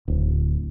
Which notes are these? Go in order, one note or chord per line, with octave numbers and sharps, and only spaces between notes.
D1